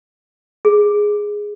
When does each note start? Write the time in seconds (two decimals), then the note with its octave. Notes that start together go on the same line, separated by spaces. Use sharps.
0.65 G#4